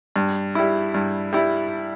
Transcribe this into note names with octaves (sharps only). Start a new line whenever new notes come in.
G2
G3 E4
G2
G3 E4